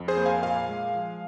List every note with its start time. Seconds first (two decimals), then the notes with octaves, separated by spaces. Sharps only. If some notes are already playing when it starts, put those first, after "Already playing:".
Already playing: F2
0.08 G#4 C5
0.17 A#3
0.26 F5 G#5
0.43 A#2 F5 G#5
0.69 G#3
0.95 F3